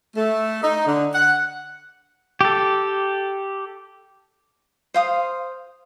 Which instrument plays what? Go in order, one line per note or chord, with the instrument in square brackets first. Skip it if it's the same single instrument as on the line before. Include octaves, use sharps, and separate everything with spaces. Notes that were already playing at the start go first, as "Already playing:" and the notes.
[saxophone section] A3
D#4
D3
F#5
[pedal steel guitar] G4 A4
[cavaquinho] C5 F5 D#6